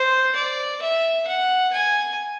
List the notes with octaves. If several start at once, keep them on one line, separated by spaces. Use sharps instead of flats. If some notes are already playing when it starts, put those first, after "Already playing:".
Already playing: C5
D5
E5
F#5
G#5